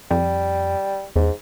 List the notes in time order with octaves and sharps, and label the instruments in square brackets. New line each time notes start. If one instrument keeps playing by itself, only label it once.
[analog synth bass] F2 [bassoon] G3
[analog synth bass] E2 [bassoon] G#2